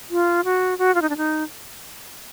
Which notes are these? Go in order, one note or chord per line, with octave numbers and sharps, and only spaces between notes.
F4
F#4
F#4
F4
D#4
D4
D#4